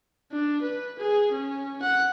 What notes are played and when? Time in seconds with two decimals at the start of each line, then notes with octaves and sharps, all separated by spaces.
0.32 D4
0.62 B4
0.99 G#4
1.31 C#4
1.82 F#5